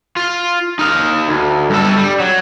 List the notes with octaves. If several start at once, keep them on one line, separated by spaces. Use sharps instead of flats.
F4
D#4 F5
D2
G2 A4
G3
F#3